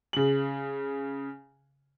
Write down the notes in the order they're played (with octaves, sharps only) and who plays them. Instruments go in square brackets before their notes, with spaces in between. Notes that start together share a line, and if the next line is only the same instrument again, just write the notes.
[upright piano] C#3 F#7